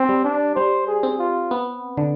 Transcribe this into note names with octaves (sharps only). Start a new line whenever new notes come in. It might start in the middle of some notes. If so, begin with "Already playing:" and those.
Already playing: C4 G4
G3
D4
G3 C5
G#4
C4
F4
B3
D3